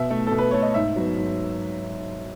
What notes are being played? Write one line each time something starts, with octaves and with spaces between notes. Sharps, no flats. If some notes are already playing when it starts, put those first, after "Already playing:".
Already playing: B2 E5
A3
B2 A4
B4
A3 C#5
D#5
G#2 E5
F#3 B3
G#2